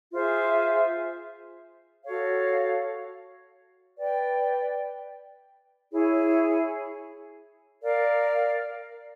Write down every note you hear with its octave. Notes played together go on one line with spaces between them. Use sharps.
F4 G#4 C5 E5
F#4 A4 C#5 F5
B4 D5 G5
E4 G#4 C#5
A#4 D5 F5